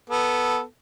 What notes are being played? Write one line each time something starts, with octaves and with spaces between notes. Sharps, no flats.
B3 A4